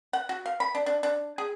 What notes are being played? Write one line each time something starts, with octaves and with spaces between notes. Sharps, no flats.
F#5
F#4
F5
B5
D4
D4
D4
G#4